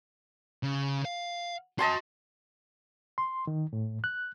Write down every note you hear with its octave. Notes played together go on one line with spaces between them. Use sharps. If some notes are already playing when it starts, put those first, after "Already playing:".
C#3
F5
F#4 D#5 G#5 A5 C6
C6
D#3
A2
F#6